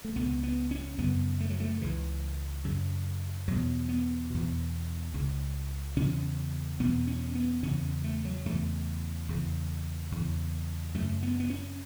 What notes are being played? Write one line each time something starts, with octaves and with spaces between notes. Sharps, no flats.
A3
C#2 C#3 B3
B3
C#4
F#2 C#3 B3
A3
F#3
A3
C#2 C#3 E3
F#2 C#3
E2 B2 F#3
B3
E2 B2
C#2 C#3
E2 C#3 C#4
E2 B2 B3
C#4
B3
E2 C#3 C#4
A3
F#3
E2 C#3 A3
E2 C#3
E2 C#3
F#2 C#3 A3
B3
B3
C#4